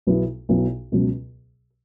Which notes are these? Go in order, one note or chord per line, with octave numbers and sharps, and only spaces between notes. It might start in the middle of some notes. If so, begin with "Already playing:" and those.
B1 B2 F#3 B3 E4
B1 B2 F#3 B3 E4
C#2 B2 F#3